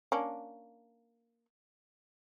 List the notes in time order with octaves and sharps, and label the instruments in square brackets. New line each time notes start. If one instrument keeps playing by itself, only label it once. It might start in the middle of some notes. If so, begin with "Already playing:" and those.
[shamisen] A#3 C#4 D4